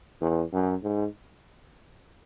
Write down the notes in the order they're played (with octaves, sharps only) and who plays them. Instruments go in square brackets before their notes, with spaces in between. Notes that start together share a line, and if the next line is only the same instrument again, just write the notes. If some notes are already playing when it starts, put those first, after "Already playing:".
[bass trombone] E2
F#2
G#2